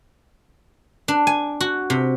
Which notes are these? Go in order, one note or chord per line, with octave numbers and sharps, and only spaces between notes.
D4
G#5
F#4
C3